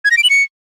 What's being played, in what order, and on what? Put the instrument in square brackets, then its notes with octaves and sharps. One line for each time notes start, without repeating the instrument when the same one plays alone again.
[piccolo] G#6
A#6
D7
F#7
C#7